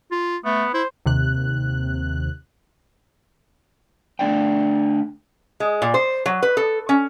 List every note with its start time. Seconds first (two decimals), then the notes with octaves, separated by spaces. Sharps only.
0.12 F4
0.45 A3 B3
0.74 E4 C5
1.06 D#2 C3 F#6
4.19 D3 A3 D4 D5 G5
5.60 G#3
5.82 A#2
5.94 C5
6.26 F#3
6.43 B4
6.57 A4
6.89 C#4